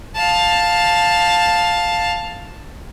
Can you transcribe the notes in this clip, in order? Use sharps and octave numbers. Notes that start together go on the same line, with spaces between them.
F5 A5